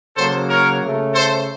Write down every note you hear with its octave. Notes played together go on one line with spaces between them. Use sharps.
C#3 F#3 A#3 A4 C5
A#4 C#5
C#3 A3
A4 C5